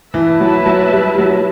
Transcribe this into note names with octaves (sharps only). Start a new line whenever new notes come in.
E3 E4 B4 E5 A5
F#3
F#3
G3
F#3